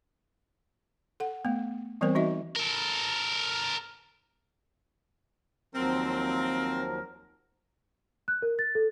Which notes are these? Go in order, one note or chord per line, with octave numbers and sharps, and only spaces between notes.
A4 F#5
A3 B3
E3 G3 B3 C4 A#4 C5
E3 D#4 F#4 D#5 E5
A4 A#4
D#2 F3 F#3 C4 A#4
F#6
A#4
A6
A4